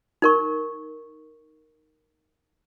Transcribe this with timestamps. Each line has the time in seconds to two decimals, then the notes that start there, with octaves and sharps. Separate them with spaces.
0.22 D#4 A#4 C#6